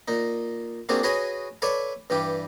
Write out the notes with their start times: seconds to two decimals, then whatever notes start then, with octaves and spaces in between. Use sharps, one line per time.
0.08 A#2 D#4
0.89 A#3 C4 D4 F#4 G#4
1.03 F#4 G#4 B4 C#5 D#5 G#5
1.62 A4 B4 C#5 D5 E5
2.10 G2 E3 G3 G4